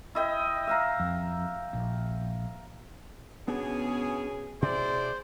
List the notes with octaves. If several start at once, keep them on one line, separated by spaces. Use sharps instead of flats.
E4 D#5 G5
E5 F5 A#5
F2
A#1
B2 B3 C#4 D4 G#4
B2 E4 G#4 C5 D5